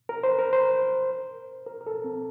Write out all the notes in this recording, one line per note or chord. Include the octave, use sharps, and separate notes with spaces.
A#4
C5
A#4
C5
A#4
A#4
A4
C4